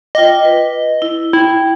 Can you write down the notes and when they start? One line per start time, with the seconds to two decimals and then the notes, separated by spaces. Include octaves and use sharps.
0.15 F4 D#5 G5 D6
0.45 B4
1.02 E4
1.33 E4 G5